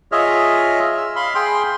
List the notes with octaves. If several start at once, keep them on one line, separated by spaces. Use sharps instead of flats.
F4 G#4 C#5 D#5 E5 F6
E6
F5 B5 C6
G#4 G5 C6